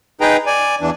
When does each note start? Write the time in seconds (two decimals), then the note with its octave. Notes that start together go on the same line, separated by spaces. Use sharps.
0.21 D#4 G#4 B4 G5 A#5
0.46 D5 G#5
0.81 E2 E3 D4